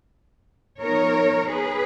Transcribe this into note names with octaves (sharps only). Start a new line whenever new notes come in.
F3 B3 D#4 A#4 C#5
G#4 B4